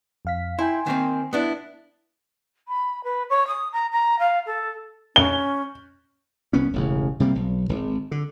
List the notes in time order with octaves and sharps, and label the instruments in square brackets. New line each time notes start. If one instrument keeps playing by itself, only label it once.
[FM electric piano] F2 F5 B6
[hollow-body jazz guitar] E4 [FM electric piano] G5 G#5 C6
[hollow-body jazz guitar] D#3 A#3 C4
B3 D4 E4
[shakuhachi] B5
B4
C#5
D#6
A#5
A#5
F5
A4
[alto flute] C#4 [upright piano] G7
[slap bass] C2 B3 C#4
E1 A1 C#3
C3 G3 A#3
B1
G#1
D3